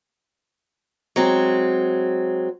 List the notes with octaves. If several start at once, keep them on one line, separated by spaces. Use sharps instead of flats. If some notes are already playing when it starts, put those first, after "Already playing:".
F#3 G#3 C4